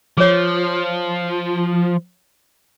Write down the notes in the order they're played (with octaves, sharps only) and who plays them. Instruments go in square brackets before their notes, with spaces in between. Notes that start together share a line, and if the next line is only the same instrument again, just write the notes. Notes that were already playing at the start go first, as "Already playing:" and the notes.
[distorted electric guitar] F3 [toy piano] G#4 C#5